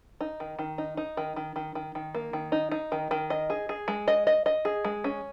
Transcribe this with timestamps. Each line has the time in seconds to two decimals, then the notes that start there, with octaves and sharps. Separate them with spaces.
0.21 D#4
0.40 D#3
0.59 D#3
0.78 D#4
0.97 D#4
1.17 D#3
1.36 D#3
1.56 D#3
1.75 D#3
1.95 D#3
2.15 A#3
2.33 D#3
2.52 D#4
2.72 D#4
2.92 D#3
3.11 D#3
3.30 D#5
3.50 G#4
3.69 G#4
3.88 G#3
4.08 D#5
4.27 D#5
4.46 D#5
4.65 G#4
4.85 G#3
5.04 C#4